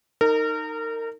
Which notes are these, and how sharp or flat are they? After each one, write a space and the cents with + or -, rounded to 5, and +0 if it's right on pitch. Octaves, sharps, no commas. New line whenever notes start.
D#4 +0 A#4 -30